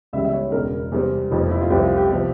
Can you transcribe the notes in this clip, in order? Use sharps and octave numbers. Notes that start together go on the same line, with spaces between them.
C#2 C#3 E3 G3 C#4 E5
E5
C#5
E1 E2 C#3 A#4
E2 C3 G3 C4
F1 F2 C3 F3
E4
F4
C2 C3 F3 C4 E4 G4
F4
G4
C3 F3